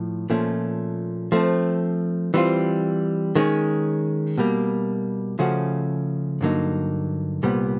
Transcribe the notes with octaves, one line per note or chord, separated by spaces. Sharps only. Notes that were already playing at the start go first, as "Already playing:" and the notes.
Already playing: A2 F3
A#2 F3 A3 C#4
F3 A3 C4
E3 G3 C4 F4
D#3 G#3 C#4
B2 G3 A#3
C#3 F3 A3 C#4 F#4
G2 D3 F#3 A#3 D#4
C2 A#2 G3 B3